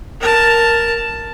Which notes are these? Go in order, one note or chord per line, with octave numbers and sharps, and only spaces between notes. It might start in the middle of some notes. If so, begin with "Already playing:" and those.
A#4 A5